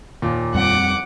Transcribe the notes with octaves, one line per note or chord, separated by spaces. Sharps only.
D#2 A#2
F2 G3 C4 F#5 D6